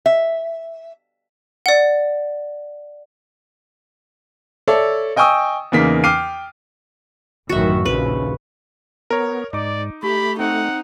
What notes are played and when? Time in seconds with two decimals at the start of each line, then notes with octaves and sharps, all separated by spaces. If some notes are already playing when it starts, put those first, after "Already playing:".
0.06 E5
1.66 D5 F#5
4.68 A4 C#5 D5 E5
5.16 D#5 G5 G#5 C#6 D#6 E6
5.72 E2 C#3 A#3 D#4 B6
6.04 G5 D6 F6 C7 D#7
7.49 A1 F#2 D#3 F#4 E5
7.85 A#1 D#2 C#3 B4
9.10 B3 A#4 C#5
9.53 G#2 D#4 D5 D6
10.03 A3 G4 B5
10.40 C4 D#4 F#5